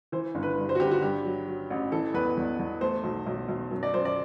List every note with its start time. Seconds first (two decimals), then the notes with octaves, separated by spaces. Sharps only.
0.12 E3 C5
0.35 G1
0.43 B4
0.58 G2
0.69 C5
0.75 F#4
0.80 G1 G4
0.91 F#4
1.02 G2 G4
1.25 F#3
1.48 F#3
1.70 A1
1.92 E3 A4
2.14 E2 B4
2.37 E2
2.59 E2
2.81 A3 C5
3.04 B1
3.27 B1
3.49 B1
3.71 F#2
3.83 D5
3.94 F#2 C5
4.05 D5